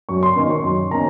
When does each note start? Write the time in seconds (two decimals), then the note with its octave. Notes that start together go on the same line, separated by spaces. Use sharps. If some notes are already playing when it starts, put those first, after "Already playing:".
0.09 F#2 C#6
0.23 C6
0.35 D#3 A#3 C#4 C6
0.50 C#6
0.63 F#2 C6
0.91 D#3 A#3 C#4 A#5